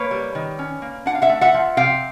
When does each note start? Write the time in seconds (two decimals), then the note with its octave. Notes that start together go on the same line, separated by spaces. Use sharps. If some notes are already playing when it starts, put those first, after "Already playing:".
Already playing: A#3 B4 C#5
0.11 G3
0.35 D#3
0.59 C#4
0.82 A#3
1.06 D4 F#5
1.15 F5
1.22 E5 F#5
1.29 A3
1.41 E5 F#5
1.54 F3
1.77 C3 F5 G5